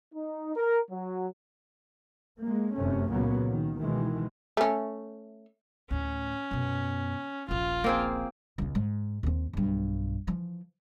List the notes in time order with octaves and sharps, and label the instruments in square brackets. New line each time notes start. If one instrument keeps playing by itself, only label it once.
[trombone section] D#4
A#4
F#3
[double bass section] G#3 A#3
F1 F#2 C3 A3 C#4
C#2 A#2 C#3 F#3 A#3 B3
D#3
B2 D#3 E3 G#3
[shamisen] A3 C#4
[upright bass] D2 A2 [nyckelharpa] C#4
[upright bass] F#2 B2
[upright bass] D#1 A#1 [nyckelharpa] F4
[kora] A#3 C4 G#4
[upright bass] C#2 B2
G#2
D#2 C4
B1 G2
E3 F3